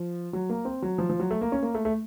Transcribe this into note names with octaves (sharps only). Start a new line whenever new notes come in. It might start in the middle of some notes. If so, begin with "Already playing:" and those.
Already playing: F3
F#3
A#3
C4
F#3
F3
F3
F#3
A3
A#3
C#4
A#3
A3
A3